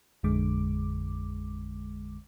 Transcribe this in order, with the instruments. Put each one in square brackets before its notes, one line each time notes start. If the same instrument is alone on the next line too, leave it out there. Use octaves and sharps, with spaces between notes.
[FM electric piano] A1 F2 D3 G#3 D6